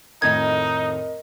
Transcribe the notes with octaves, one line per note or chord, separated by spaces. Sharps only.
F2 A2 D#3 D#4 A#4 D#5 G#6